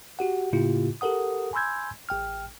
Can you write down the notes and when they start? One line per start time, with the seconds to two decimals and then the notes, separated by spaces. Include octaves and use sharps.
0.19 F#4 G4 F#5
0.53 A2 C#3 A#3 E4 F4 G4
1.01 G4 A4 A#4 F#5 D#6
1.53 G#5 B5 C6 E6 G6 G#6
2.09 A1 G5 F6